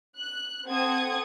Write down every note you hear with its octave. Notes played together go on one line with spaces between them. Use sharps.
F#6
C4 A4 F#5 D#6 G#6